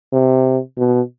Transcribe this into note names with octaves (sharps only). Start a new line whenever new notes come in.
C3
B2